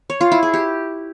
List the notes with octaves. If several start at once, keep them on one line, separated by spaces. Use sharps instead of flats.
C#5
F4
E4
G#4
G4